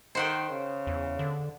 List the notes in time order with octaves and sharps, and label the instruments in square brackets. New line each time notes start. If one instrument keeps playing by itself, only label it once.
[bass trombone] D#3 [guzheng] C5 F#5 G5
[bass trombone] C#3
[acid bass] E2
D3